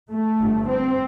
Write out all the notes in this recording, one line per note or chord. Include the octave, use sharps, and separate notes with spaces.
A3
G1 G2
C4